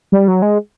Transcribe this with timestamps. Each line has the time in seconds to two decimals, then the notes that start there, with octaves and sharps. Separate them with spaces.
0.12 G3
0.28 F#3
0.42 G#3